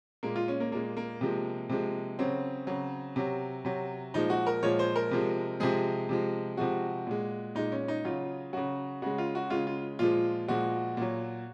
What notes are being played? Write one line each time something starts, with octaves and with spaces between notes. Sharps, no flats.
A#2 G#3 A#3
F4
C#4
A#3
A#2 G#3 A#3
A#3
C3 F3 G#3
C3 F3 G#3
C#3 F#3 C4
C#3 F#3
C3 F#3
C3 F#3
A#2 F3 G#3 D#4
F#4
A#4
A#2 F3 G#3 C#5
C5
A#4
C3 F3 G#3
C3 F3 G#3 G#4
C3 F3 G#3
C3 F3 G#3 F#4
A#2 G#3
A#2 G#3 D#4
C#4
D#4
C#3 F#3 F4
C#3 F#3 F#4
C#3 G#3 F#4
F4
F#4
C#3 G#3 F4
F4
A#2 F3 G#3 F4
A#2 F3 G#3 F#4
A#2 F#3